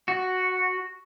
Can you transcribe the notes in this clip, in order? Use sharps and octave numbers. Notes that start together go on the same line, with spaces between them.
F#4